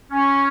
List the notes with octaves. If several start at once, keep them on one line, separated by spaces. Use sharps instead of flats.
C#4